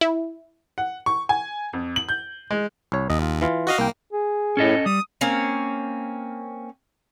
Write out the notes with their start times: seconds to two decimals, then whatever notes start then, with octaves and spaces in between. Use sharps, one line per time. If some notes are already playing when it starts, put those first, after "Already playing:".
0.01 E4
0.78 F#5
1.06 C#6
1.29 G#5
1.73 F2
1.96 F#7
2.09 G6
2.51 G#3
2.92 C2 C#5
3.10 D#2 D#5
3.22 F4
3.42 E3 F4
3.67 F#4 D#5 F5
3.78 C2 A#3 G5
4.12 G#4
4.57 A2 C#4 A4 D#5
4.86 G3 D#6
5.21 A#3 C4 C#4 F5